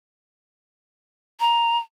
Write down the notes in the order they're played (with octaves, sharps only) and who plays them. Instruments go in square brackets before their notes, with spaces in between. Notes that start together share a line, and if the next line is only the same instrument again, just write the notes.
[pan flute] A#5